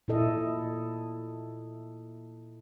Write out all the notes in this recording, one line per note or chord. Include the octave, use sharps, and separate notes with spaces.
A#2 E4 A4 D#5